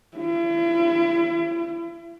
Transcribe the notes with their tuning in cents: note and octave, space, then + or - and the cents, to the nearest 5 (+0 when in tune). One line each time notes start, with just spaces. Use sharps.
E4 +40